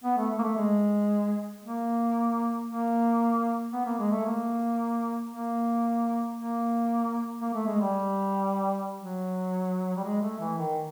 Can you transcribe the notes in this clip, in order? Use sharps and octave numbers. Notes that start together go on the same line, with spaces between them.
B3
A3
A#3
A3
G#3
A#3
A#3
B3
A#3
G#3
A3
A#3
A#3
A#3
A#3
A3
G#3
G3
F#3
G3
G#3
A3
E3
D#3